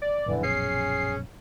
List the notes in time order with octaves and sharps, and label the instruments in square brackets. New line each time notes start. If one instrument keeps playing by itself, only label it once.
[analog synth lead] D5
[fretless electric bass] A#1 F#2 B2 [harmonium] D3 E3
[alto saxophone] C#4 [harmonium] G#4 [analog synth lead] C7